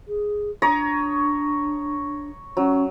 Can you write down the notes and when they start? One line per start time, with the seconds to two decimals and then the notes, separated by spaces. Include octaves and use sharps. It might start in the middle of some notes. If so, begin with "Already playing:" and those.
0.07 G#4
0.62 D4 C#5 A#5 D#6
2.57 F#3 C#4